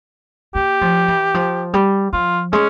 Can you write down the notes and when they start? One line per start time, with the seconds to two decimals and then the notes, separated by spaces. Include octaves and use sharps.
0.55 A#3 G4
0.81 F3
1.08 E3
1.34 F3
1.74 G3
2.13 F3 F4
2.52 G#3 C#4